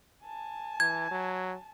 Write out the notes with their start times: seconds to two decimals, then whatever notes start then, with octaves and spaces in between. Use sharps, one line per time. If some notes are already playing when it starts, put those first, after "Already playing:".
0.24 G#5 A5
0.80 E3 G#6
1.11 F#3